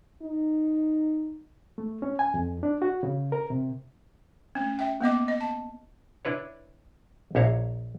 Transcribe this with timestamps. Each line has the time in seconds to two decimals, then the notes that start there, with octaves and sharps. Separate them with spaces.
0.22 D#4
1.78 A3
2.02 C#4
2.19 G#5
2.34 F2
2.63 D4
2.82 F#4
3.03 C#3
3.32 A#4
3.50 C3
4.55 A3 C#4
4.79 E5 G5
5.01 A#3 B3 D#5 D6
5.28 D#5
5.41 A5
6.25 D4 E4 B4 C#5
7.35 A#1 E4 C#5 F5 A#5